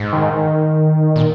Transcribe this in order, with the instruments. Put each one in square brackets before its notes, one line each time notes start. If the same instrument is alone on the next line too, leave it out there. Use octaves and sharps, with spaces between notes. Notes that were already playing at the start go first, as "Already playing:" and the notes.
Already playing: [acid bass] G#2
[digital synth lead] D#3
[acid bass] A#2